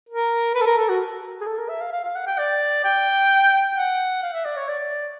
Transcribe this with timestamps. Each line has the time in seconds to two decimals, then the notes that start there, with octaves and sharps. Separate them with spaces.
0.09 A#4
0.55 B4
0.61 A4
0.66 A#4
0.78 A4
0.89 F#4
1.41 G#4
1.46 A4
1.58 A#4
1.69 E5
1.81 F5
1.92 F5
2.04 F5
2.15 F#5
2.26 G5
2.38 D5
2.84 G5
3.77 F#5
4.22 F5
4.33 E5
4.45 D5
4.57 C#5
4.68 D5